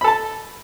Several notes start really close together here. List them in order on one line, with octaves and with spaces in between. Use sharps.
B5 A4 A5